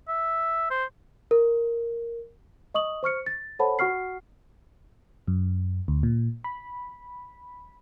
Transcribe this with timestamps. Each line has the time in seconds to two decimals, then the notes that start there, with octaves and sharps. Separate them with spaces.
0.08 E5
0.71 C5
1.31 A#4
2.74 D#5 C#6 D#6 F#7
3.03 C5 C#6 F6 C#7
3.26 A6
3.59 A4 C5 C#5 F#5 A5 B5
3.79 F#4 F#5 C#6 F6 C7
5.28 F#2
5.88 D2
6.03 A#2
6.44 B5